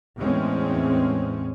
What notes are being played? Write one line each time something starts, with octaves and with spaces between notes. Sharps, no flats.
E2 A2 G#3 C4 C#4